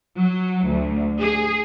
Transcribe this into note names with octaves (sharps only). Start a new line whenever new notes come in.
F#3
D2
G#4